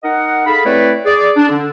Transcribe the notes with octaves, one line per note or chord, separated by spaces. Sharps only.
D#4 A#4 D#5 F#5
G#4 A4 F5 B5
A3 C4 E4 B4 C#5 D5
G#4 D5
D4
D3